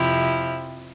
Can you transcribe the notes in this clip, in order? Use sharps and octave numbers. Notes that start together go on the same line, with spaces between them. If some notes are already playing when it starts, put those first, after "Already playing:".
Already playing: F2 C3 F3 E4 G4